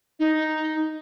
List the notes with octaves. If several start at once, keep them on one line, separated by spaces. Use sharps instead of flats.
D#4